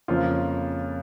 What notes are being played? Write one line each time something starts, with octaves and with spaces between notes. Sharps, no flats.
F2 C#3 F3 A#3 C#4 F4